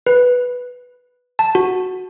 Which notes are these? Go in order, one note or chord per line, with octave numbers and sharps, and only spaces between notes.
B4
A5
F#4